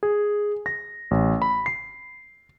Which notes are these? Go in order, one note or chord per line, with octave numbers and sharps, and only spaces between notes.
G#4
A#6
A1
B5
C7